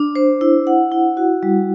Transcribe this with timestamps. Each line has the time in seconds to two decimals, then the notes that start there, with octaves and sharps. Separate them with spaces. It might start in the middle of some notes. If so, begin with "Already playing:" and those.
Already playing: D4
0.15 C5
0.41 E4
0.67 F#5
0.92 E4
1.17 F#4
1.43 G3